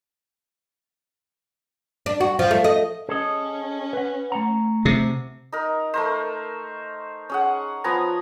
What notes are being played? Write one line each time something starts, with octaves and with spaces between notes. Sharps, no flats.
D4
F#4
F3
A3
D#5
C#4 G#4 A4 D#5
B4 F#5
A3 F#5 A#5
C3
D#4 A#4
A3 A#4 C5
C#4 G#4 F#5
F3 B3 G#5 A#5